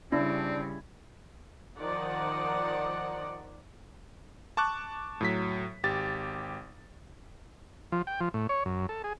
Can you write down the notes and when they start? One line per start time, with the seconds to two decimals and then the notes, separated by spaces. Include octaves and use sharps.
0.12 C#3 G3 C4 D4 E4
1.79 D#3 F3 D#4 D5 F#5
4.57 A5 C#6 D6 F#6
5.21 A2 F#3 B6
5.83 G#1 G4 A6
7.92 F3
8.07 G5
8.20 F3
8.34 A2
8.49 C#5
8.66 F#2
8.89 A4
9.04 G#4